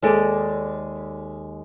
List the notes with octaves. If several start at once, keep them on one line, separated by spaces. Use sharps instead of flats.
D#2 G#3 A4 D5